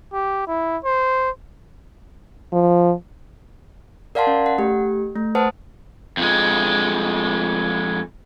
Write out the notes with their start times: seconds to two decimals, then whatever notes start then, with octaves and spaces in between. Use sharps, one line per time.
0.13 G4
0.47 E4
0.84 C5
2.52 F3
4.15 A#4 D5 F5 F#5 A5 C6
4.27 C#4
4.46 F#5
4.58 A3 G4
5.16 A3
5.35 B4 C5 F#5 A5 D#6
6.17 F2 G#3